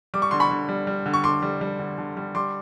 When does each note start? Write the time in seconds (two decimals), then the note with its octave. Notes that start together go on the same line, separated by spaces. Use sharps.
0.14 G3 D6
0.22 C#6
0.31 D3 C6
0.40 B5 C#6
0.51 D3
0.69 G3
0.87 G3
1.06 D3
1.14 C#6
1.24 D3 C6 D6
1.42 G3
1.61 G3
1.79 D3
1.98 D3
2.17 G3
2.35 G3 C6 D6